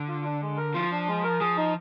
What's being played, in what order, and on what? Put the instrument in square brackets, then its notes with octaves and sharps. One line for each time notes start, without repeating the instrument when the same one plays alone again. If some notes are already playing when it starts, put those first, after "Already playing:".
Already playing: [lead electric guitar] D3
[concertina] F4
D4
G#3
A#4
[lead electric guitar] F3 [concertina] F4
[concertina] D4
G#3
A#4
[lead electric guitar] F3 [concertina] G#4
[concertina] D#4